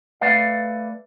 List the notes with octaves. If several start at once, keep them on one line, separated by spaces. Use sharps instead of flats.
A3 B4 D5 F5